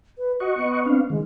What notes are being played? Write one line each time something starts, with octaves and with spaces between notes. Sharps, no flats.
B4
F#4 D#5 F#5 C#6
B3
C4 D4 F5
D#3 G#3